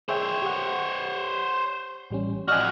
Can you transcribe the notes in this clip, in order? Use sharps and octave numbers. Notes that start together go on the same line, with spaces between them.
G#4 C5 C#5 E5 G5
G4 F#5
A1 G3 C#4
F2 F#4 D5 D#5 G#5 F6